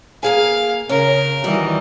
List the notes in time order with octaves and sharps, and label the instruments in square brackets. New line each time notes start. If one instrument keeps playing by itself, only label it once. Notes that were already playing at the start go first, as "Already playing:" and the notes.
[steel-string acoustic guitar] A#3 G#4 G#5 [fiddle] F5
[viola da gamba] C#3 [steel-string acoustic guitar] C#4 [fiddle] A#4
[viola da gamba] D#3 E3 G3 [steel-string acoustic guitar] F#4 D#5